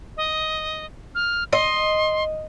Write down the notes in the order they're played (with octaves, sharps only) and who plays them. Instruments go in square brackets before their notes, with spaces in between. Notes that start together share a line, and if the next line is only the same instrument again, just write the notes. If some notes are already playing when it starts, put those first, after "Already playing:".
[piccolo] D#5
F6
[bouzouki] D#5 [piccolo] C6